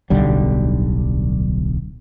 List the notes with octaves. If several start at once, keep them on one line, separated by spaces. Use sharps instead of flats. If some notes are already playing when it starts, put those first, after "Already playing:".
D1 B1 D3 G3